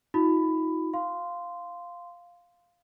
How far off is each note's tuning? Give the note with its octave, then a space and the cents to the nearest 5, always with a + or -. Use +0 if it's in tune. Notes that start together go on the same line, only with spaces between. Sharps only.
D#4 +45 F#4 -40 B5 +15
F5 +0 C6 -10